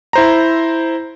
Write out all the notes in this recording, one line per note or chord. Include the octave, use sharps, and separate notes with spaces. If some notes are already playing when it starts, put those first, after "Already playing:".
E4 C5 A#5